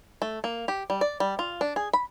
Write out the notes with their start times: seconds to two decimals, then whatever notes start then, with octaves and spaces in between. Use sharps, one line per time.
0.22 A3
0.44 A#3
0.68 G4
0.90 G3
1.01 D5
1.20 G3
1.39 F4
1.61 D4
1.76 G#4
1.93 B5